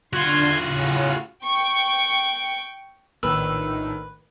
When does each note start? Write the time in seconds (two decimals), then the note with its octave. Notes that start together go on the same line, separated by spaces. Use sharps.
0.13 D3 F4 F#4 C6 G#6
0.62 A2 C#3
1.44 G5 C#6
3.23 A#1 A2 D#3 B4 E6